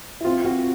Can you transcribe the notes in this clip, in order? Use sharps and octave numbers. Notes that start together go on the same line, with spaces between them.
E4
C4 F4
C4 F#4